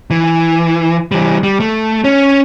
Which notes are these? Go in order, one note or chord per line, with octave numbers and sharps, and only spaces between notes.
E3
E3 G3
G3
A3
C#4